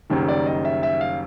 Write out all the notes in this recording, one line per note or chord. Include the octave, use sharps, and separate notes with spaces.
F#1 F#2 D#3 G3
D5
D#5
E5
E5
F5